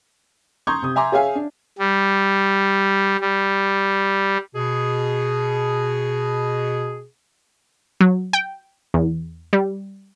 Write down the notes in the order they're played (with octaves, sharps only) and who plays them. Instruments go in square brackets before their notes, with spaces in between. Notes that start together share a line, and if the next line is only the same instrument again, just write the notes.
[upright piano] A#5 C6 C#6 D#6 G6 G#6
C3 D#6
E5 G#5 A#5 C6 D6
G#4 C#5 E5 F5 G#5
D4
[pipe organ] G3
G3
[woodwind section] B2 G#4
[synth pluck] F#3
G5
E2
G3